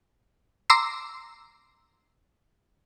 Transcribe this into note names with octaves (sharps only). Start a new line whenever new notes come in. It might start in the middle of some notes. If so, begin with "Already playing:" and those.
A#5 C6 D6 E6 C7